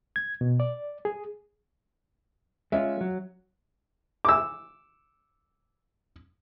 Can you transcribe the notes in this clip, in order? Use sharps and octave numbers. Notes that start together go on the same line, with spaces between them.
G#6
B2
D5
G#4
G#3 C#4 F4 E5
F#3
D6 E6